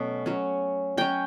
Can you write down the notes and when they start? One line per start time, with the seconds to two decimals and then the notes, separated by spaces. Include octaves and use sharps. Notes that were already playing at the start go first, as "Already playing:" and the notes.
Already playing: B2 F#3 A3 C#4
0.26 F#3 C#4
0.97 F#3 C#4 G5